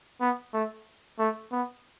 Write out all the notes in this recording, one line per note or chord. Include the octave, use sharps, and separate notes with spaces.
B3
A3
A3
B3